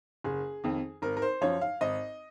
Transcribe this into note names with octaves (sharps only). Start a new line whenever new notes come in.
F#1 G#4
F2 D#3
G#1 A#4
A#4
C5
F#2 F3 C#5
F5
G#1 D#5